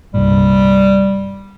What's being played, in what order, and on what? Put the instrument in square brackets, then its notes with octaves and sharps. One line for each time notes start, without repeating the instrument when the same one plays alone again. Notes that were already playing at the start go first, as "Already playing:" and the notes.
[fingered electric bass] C2 G2 A#2 [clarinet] G3